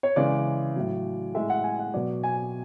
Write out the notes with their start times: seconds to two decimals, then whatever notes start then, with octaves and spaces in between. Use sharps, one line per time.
0.03 C#5
0.16 C#3 E3 G#3 D5
0.76 A2 F#3
1.35 A2 G#3 E5
1.50 F#5
1.64 G#5
1.79 F#5
1.94 B2 F#3 D5
2.23 G#5